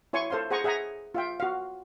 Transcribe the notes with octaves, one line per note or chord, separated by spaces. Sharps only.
E4 C#5 G#5 C6 C#6
A4 C5 F5 C6
G#4 C5 F#5 G#5 A#5 C#6
G#4 E5 F#5 G#5 A#5
F4 E5 G5
F#4 F5